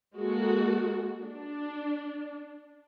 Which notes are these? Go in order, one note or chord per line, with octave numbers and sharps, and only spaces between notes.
G#3 A#3 F#4 A4
D4